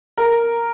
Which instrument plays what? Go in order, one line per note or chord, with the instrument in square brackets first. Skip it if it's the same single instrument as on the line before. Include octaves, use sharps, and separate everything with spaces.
[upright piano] A#4